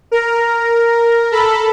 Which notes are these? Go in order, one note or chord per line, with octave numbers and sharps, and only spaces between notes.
A#4
A4 B5